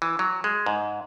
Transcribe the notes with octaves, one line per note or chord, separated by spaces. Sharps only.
E3
F#3
G#3
G#2